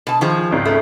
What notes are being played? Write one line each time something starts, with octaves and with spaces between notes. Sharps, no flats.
B2 A5
D#3 F3 G#4
G#1 C#2 C#3
A3